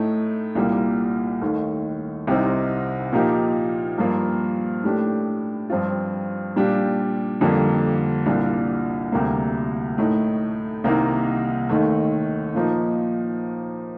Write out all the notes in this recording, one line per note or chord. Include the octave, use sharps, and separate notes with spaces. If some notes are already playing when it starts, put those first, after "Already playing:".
Already playing: A2 A3 D#4
C2 A#2 G3 A#3
D#2 D#3 A3
C2 C3 G3 C4 D#4
A#2 F3 A#3 D#4 G4
G2 F3 A#3 F4
A2 A3 D4 G4
G2 F3 C4 F4
A#2 G3 D4 G4
F2 D3 G3 A#3
C2 A#2 G3 A#3 D4
D2 C3 G3 A#3
A2 A3 D#4
C2 C3 D#3 A#3 D#4
D#2 D#3 A3
A#2 F3 A#3 D#4